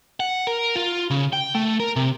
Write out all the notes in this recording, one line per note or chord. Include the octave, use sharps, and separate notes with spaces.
F#5
A#4
F4
C#3
G5
A3
A#4
C3